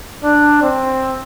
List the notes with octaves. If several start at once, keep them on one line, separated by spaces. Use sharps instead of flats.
D4
C4